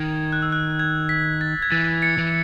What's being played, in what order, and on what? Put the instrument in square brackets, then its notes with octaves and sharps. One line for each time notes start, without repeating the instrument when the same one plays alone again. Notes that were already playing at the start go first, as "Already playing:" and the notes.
Already playing: [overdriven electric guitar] D#3 [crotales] G#6
[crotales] F#6
E6
F#6
G#6
B6
A6
G#6
[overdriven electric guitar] E3 [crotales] A6
[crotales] A6 C#7
[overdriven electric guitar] E3